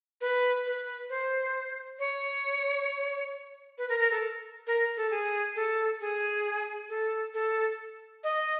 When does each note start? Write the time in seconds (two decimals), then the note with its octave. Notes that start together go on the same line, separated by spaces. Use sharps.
0.21 B4
0.66 B4
1.10 C5
1.99 C#5
3.78 B4
3.89 A#4
3.99 A#4
4.11 A4
4.67 A#4
4.97 A4
5.11 G#4
5.56 A4
6.01 G#4
6.90 A4
7.34 A4
8.24 D#5